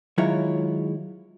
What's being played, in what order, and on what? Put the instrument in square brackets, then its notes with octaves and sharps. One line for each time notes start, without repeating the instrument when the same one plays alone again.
[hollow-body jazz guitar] D#3 F#3 G#3 E4 F4 C#5